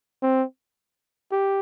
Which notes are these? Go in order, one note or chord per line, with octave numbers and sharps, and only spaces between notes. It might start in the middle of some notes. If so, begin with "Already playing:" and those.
C4
G4